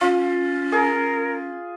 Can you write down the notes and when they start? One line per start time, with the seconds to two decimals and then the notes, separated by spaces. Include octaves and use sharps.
0.01 C#4 F4
0.72 G#4 A#4